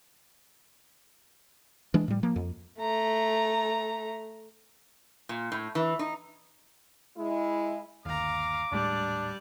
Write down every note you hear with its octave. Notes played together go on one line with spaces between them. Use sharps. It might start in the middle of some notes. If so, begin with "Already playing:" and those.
E3 G#3 D4
A2 G3
F3 A#3
F2
A3 A#5
A#2
A2
E3
D#4
G#3 E4
G1 D#2 F5 A#5 D6
D#1 A2 G3 G#3 D4 D5